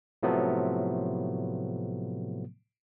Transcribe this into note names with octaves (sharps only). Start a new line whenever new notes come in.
A2 C3 F3 F#3 A3 B3